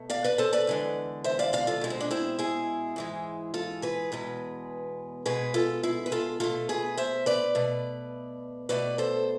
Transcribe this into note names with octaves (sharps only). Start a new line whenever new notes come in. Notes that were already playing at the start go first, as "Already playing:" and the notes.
Already playing: B2 A3
D5 F5
B4 D5
A4 C5
B4 D5
E2 D3 G#3
C5 E5
D5 F5
D5 F5
F4 A4
B2 G#3
C4
D4
C4 E4
E4 G#4
G#2 E3 G#3
F4 A4
G#4 B4
E2 B2 G#3
B2 G#3 G#4 B4
F4 A4
E4 G#4
B4
F4 A4
B2 A3 F4 A4
G#4 B4
C5 E5
B4 D5
B2 A3
B2 A3 B4 D5
A4 C5